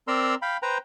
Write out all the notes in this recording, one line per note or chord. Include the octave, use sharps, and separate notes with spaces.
C4 A#4 D5 A#5 C6 E6
F5 G5 B5
B4 C5 G5 A#5